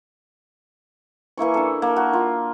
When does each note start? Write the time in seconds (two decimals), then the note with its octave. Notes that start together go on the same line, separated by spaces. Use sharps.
1.37 E3 A#3 E4 C#6
1.54 D4 A4
1.82 A#3
1.96 F#4
2.13 F4